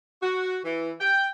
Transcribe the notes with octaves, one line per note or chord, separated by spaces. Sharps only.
F#4
E3
G5